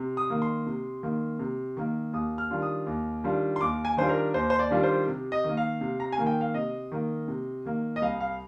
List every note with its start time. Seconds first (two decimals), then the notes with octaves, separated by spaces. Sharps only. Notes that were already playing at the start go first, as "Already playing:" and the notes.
Already playing: C3
0.17 D#6
0.30 D#3 A#3
0.42 C6
0.66 C3
1.03 D#3 A#3
1.39 C3
1.77 D#3 A#3
2.13 D#2 D#6
2.38 F6
2.51 D#3 G3 D4 F4
2.62 D#6
2.86 D#2
3.24 D#3 G3 D4 F4
3.56 C6
3.61 D#2 D6
3.85 G#5
3.97 D#3 G3 D4 F4 C5
4.09 A#4
4.34 D#2 C5
4.50 C5
4.59 D5
4.71 D#3 G3 D4 F4
4.83 C5
5.07 C3
5.32 D#5
5.44 D#3 A#3
5.57 F5
5.81 C3
6.00 A#5
6.12 G#5
6.18 D#3 A#3
6.27 G5
6.41 F5
6.54 C3 D#5
6.92 D#3 A#3
7.28 C3
7.65 D#3 A#3
7.96 D#5
8.02 C2 F5
8.21 F5